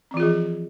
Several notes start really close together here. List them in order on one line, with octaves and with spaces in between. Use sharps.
C4 E3 F4 G#4 F3